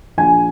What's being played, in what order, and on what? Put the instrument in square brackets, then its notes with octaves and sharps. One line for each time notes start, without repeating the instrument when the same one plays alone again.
[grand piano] A#1 G#5